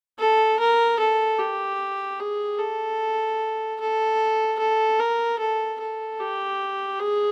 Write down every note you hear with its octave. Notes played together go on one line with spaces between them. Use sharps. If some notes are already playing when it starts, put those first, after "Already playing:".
A4
A#4
A4
G4
G#4
A4
A4
A4
A#4
A4
A4
G4
G#4